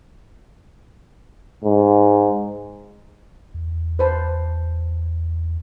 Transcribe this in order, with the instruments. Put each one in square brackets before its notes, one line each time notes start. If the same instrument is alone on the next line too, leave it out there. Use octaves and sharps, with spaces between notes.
[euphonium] G#2
[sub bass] E2
[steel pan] B4 C5 A5